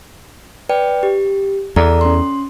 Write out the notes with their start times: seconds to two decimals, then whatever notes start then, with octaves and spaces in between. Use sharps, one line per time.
0.69 B4 D5 G5
1.03 G4
1.76 E2 A4 D5 A#5
2.01 C#4 C6